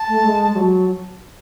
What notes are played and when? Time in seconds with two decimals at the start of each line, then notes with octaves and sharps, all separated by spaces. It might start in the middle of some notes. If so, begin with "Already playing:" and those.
Already playing: A5
0.08 A3
0.24 G#3
0.51 G#3
0.56 F#3